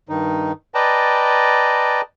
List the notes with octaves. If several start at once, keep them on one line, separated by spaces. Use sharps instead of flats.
G2 D#3 D#4
B4 D5 D#5 G5 A5 A#5